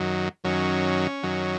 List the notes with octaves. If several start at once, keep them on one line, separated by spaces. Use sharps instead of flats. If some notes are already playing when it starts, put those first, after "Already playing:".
Already playing: F#2 D#3 F#3
F#2 D#3 F#3 C#4
F#2 D#3 F#3